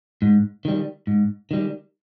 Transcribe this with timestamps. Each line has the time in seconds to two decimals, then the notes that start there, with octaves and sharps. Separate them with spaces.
0.22 G#2
0.65 D#3 G3
1.07 G#2
1.51 D#3 G3